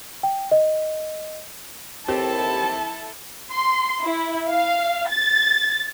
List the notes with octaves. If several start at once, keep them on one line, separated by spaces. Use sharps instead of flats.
G5
D#5
D#2 C4 E4 G4 A4 A5
C6
E4
F5
A6